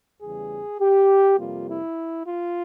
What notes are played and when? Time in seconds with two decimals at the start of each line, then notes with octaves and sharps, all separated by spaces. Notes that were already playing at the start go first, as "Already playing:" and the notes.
0.21 E2 C#3 E3 G3 G#4
0.80 G4
1.38 F2 C3 G3 A#3 F4
1.68 E4
2.27 F4